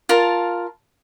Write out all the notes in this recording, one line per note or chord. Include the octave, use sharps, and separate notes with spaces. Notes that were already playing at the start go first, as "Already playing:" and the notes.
F4 A#4 F5 A5